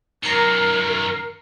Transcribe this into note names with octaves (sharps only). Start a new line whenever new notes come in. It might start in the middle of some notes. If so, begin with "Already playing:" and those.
F#2 D#3 A#4 A#5 C7 C#7